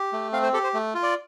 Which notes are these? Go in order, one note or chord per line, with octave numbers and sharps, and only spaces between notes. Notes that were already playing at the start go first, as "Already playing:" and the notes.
Already playing: G4
A3
C4 F5
C5
G4 A4
C5
A3
F4
D5